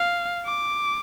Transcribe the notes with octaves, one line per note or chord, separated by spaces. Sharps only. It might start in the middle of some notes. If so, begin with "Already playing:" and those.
Already playing: F5
D6